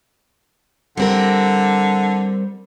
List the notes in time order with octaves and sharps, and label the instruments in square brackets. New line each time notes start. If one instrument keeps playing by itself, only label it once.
[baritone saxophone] D3 [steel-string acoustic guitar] G3 C4 A#4